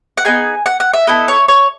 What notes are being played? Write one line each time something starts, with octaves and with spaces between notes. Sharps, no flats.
F#5
B3 D#4 G#4 G#5
F#5
F#5
E5
B3 E4 A4 D#5
C#5
C#5